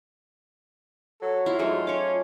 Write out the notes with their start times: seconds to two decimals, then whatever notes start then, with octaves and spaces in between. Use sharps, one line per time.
1.22 F#3 A4
1.46 E4 F4
1.59 G#2 F#3 A3 D#4
1.87 C#4 C#5 D6